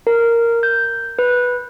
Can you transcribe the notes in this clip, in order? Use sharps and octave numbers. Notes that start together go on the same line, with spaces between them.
A#4
G6
B4